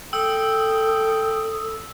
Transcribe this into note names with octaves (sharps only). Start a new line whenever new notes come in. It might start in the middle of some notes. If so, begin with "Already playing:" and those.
A4 G5 D#6 E6